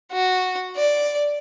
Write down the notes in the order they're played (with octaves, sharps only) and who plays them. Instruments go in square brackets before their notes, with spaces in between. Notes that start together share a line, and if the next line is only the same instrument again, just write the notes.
[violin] F#4
D5